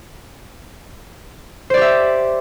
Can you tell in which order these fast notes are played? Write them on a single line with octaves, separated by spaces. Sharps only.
C5 D5 G4 E5